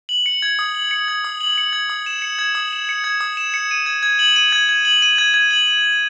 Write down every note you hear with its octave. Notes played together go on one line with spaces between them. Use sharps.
F#7
C#7
G#6
D#6
F#7
C#7
G#6
D#6
F#7
C#7
G#6
D#6
E7
C#7
G#6
D#6
E7
C#7
G#6
D#6
E7
C#7
D#7
G#6
G#6
F#7
D#7
G#6
G#6
F#7
D#7
G#6
G#6
F#7